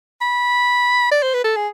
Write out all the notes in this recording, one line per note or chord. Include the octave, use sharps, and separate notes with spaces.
B5
D5
C5
B4
A4
G#4